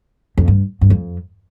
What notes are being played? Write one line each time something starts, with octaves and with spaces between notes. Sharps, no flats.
F2
G2
G2
F2